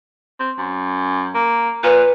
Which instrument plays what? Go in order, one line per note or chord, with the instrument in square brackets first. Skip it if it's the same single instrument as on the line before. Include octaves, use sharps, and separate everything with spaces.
[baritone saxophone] C4
F#2
A#3
[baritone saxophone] A#2 [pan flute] B4